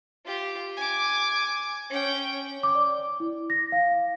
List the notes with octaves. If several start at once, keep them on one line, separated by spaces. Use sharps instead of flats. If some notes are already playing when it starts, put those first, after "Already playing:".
F4 G4
G#5 D6
C#4 G5
D6
D5
E4
A#6
F5
F5